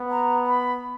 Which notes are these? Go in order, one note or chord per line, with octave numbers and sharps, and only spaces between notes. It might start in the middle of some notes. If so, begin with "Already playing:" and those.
Already playing: B3
A#5
B5